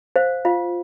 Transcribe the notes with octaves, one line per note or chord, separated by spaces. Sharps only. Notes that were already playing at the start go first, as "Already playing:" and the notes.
C5 F5
F4 F5